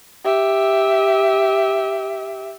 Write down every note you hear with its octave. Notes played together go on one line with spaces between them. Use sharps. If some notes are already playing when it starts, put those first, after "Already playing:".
G4 E5